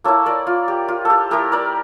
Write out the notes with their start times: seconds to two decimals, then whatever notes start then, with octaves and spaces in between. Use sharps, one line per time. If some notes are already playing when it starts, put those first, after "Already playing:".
0.04 A#3 E4 A4 C#5
0.26 A#4 D5
0.47 F4
0.68 G4
0.88 F4
1.05 G4 A4
1.31 A3 E4 G4 A#4
1.52 A#4 D5